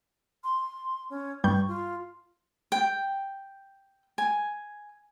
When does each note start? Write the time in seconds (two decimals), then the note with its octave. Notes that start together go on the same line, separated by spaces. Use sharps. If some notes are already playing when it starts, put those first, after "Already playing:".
0.44 C6
1.10 C#4
1.44 G2 G3 C#6 G6
1.68 F4
2.72 G5
4.18 G#5